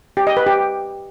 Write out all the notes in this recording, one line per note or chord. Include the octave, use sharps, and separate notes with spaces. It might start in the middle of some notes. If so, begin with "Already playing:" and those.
G4
D#5
B4
G4